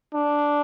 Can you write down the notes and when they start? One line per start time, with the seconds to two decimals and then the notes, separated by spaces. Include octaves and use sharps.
0.14 D4